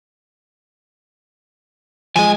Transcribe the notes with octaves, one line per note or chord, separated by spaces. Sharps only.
F3 G#3 G#5